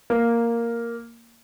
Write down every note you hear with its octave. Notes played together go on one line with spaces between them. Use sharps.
A#3